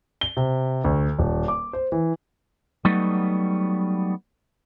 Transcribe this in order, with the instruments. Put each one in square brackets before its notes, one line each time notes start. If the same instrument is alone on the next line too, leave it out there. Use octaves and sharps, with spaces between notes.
[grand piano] G7
C3
D2
D#1
D6
C5
E3
[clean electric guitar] F#3 G3 A3 B3 D#4